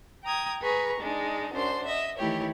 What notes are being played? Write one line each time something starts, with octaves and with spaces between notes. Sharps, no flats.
G5 A#5 D#6 G#6
G#4 B4 A#5 C#6
G#3 D4 D#4
F#2 D4 C5 C6
D#5 E5
D#3 E3 A3 E4 G4 C#5